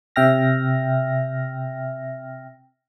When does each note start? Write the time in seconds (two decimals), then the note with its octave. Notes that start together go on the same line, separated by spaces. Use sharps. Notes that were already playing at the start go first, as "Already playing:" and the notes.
0.16 C3 E5 G5 F6 A#6